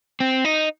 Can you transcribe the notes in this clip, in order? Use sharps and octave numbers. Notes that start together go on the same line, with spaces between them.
C4
D#4